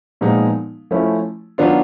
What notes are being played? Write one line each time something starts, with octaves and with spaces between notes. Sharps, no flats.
A#2 F3 G#3 B3 D#4
F3 A3 C#4 E4
D#3 F#3 B3 D4 F4